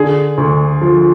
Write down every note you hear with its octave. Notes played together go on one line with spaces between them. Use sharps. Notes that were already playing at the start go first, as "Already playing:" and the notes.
Already playing: D3 G#4
D2
F3